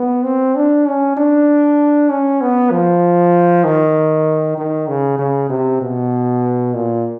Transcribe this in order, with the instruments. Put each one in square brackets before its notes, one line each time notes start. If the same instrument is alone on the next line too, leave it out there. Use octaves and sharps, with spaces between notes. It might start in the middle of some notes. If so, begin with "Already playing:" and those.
Already playing: [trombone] B3
C4
D4
C#4
D4
C#4
B3
F3
D#3
D#3
C#3
C#3
C3
B2
A#2